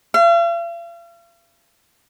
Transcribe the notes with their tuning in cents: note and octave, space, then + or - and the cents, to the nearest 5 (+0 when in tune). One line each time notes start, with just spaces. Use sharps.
F5 -45